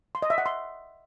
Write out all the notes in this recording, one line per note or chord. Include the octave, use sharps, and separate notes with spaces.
C6
D#5
E5
F#5
C6